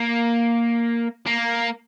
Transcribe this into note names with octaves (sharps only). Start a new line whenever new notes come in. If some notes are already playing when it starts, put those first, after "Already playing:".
Already playing: A#3
A#3